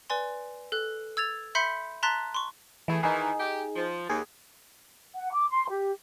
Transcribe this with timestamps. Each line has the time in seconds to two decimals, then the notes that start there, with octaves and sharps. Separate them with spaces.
0.10 B4 D5 G#5 C6
0.72 A4 F#6
1.17 E6 G#6 A6 F7
1.55 E5 B5 C6 G6 B6 C#7
2.03 A5 A#5 C6 F#6 A6 B6
2.35 C6 C#6
2.88 E3 A3 E4 G#4
3.03 D#3 E3 D#4 G#4
3.40 G4
3.76 F3
4.10 D#2 G#4
5.15 F#5
5.33 D6
5.50 C6
5.70 G4